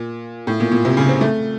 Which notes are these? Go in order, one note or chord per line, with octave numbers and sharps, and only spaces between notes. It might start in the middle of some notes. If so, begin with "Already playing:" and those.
Already playing: A#2
A2
A#2
A#2
C3
C#3
C4
A3